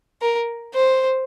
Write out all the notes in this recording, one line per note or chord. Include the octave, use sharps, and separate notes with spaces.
A#4
C5